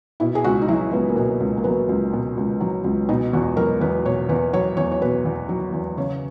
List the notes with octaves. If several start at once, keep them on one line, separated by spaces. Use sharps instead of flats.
B2 E4
G#4
C#2 F#4
D#4
F#3 E4
C#2 B3
A#3
B2 B3
C#2
A#3
F#3 B3
C#2
B2
C#2
F#3
C#2
B2 D#4
E2 F#4
F#3 A#4
E2 B4
B2 C#5
E2 B4
F#3 C#5
E2 C#5
C#5
B2 B4
E2
F#3
E2
C#3 C#5